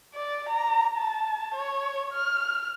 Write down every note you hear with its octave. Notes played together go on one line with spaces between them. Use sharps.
D5
A#5
A5
C#5
F6